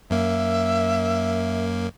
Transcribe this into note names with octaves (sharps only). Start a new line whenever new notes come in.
F#2 A#3 E5